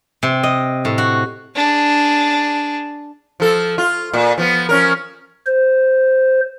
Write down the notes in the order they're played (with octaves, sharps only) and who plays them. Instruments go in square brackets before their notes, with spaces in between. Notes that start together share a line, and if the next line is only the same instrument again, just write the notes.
[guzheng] C3
D#5
A2
F#4
[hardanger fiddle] D4 G#4
[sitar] F3 A4
F4
A#2
F3 B3
F3 C#4 A#4
[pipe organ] C5